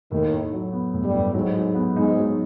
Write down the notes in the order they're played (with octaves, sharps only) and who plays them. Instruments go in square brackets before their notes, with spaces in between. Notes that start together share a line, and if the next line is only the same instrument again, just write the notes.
[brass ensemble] D#2 D#3 [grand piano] A2
[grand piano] A2
F#3
B3
A2
[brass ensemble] G2 G3
[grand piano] A2
[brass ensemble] G#2 G#3 [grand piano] F#3
[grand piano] F#3
B3
[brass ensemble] G#2 G#3 [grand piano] D#4
[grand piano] F#3